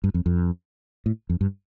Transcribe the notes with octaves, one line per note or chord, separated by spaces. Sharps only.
G2
F2
F2
A2
F2
G2